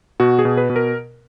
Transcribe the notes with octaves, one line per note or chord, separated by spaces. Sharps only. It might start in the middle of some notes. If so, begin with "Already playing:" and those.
B2 F#4
G#4
B2
B4
B2
A#4